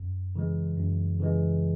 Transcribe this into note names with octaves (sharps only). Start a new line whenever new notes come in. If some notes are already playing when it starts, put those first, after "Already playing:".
Already playing: F#2
C#3 E3 G#3
F#2
C#3 E3 G#3